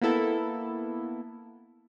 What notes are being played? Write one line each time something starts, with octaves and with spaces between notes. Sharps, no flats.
A#3 B3 E4 A4